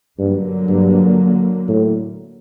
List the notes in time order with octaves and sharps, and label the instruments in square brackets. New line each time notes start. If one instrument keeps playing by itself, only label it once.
[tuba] G2 [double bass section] D3 F#3 A#3
[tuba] G2
A2